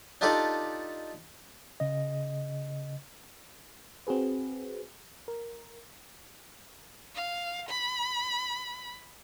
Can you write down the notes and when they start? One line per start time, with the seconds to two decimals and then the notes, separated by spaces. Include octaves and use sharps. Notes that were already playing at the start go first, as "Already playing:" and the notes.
0.21 D4 D#4 F4 G4 A4 D5
1.80 C#3 D#5
4.07 C4 F#4 G#4 B4
5.28 A#4
7.15 F5
7.69 B5